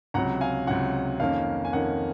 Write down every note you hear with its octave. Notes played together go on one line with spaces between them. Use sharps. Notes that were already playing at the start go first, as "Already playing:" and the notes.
C#2 C3 F#3 F#5 A#5
F5 G#5
C#2 C3 F#3 F#5
F2 D#3 A#3 C#4 F5
G#5
F2 D#3 A#3 C#4 F#5